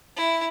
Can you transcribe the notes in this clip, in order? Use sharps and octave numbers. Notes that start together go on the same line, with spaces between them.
E4